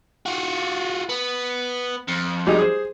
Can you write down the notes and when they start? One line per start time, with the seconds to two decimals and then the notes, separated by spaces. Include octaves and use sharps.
0.26 F4 F#4
1.09 B3
2.08 F2
2.47 G3 G#3 D#4
2.59 G#4 C5